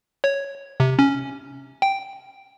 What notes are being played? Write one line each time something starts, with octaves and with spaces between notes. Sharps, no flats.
C#5
C3
C#4
G5